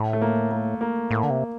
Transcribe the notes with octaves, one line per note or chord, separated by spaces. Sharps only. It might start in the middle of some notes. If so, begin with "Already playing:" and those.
Already playing: A2
A3
A#3
A#3
A#3
A2 A#3
D3
C3